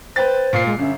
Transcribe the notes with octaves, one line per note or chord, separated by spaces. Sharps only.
B4 C5 G5 A6
A#2 F5 C7
G#3
G1 C#4 E5